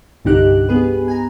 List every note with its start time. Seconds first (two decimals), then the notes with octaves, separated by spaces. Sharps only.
0.25 C2 G2 D3 D#4 G4 F#6
0.69 B3 G#4 B4
1.08 G#5 A#5